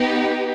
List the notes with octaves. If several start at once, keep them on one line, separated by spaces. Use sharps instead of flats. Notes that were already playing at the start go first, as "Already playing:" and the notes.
Already playing: B3 D#4 G4